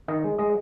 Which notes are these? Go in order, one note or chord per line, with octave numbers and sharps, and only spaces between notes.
D#3 D#5
G#3
G#3 D#5